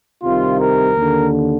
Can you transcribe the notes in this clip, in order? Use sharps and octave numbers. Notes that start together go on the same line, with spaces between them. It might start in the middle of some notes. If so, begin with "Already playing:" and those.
C2 C3 D#3 F4
A#4
D#2 D3